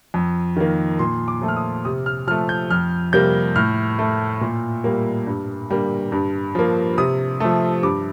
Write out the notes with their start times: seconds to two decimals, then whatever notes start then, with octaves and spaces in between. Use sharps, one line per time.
0.14 F2
0.57 D#3 A#3
0.99 A#2 C6
1.28 D6
1.42 F3 A3
1.48 F6
1.56 D#6
1.85 C3 D#6
2.06 F6
2.27 F3 F6
2.31 A3
2.49 G6
2.70 F2 F6
3.13 C3 G3 A#3 G6
3.56 A2 F6
3.99 A3
4.41 A#2
4.84 G3 A#3
5.27 G2
5.70 D3 G3 A#3
6.12 G2
6.55 F3 A#3
6.98 C3 D#6
7.40 F3 A3
7.83 G2 D6